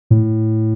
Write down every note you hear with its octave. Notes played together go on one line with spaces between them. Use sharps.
A2